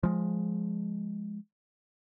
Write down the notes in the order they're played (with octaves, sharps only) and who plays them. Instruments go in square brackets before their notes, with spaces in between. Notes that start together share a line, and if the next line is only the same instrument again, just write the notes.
[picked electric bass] F3 G#3